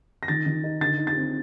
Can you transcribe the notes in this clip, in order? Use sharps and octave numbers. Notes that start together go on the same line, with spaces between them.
A#6
D#3 A6
D#3
D#4
D3 A6
D#4
A6
C4